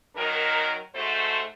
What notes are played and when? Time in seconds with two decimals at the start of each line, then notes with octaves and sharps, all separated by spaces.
0.17 D#3 F#3 D#4 A#4
0.95 G#2 A3 F#4 A4 C5